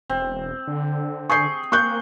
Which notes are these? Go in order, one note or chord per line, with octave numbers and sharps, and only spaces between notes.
E1 C4
D3
G#4 C#6 G6 C7
A#3 C#6 F#6 G6